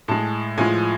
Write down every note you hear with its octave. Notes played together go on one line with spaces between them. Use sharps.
A2 G#3 A5
A2 F3 G#3 G#5